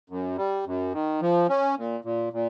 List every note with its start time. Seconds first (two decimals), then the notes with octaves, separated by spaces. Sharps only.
0.10 F#2
0.38 G3
0.66 F#2
0.94 D#3
1.21 F3
1.49 C#4
1.78 A#2
2.04 A#2
2.33 A#2